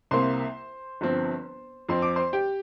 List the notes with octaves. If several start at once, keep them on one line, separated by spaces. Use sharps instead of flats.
C2 C3 A#3 C5 C6
G1 G2 F3 C4
F2 F3 C4 C6
D6
C5 C6
G4 G5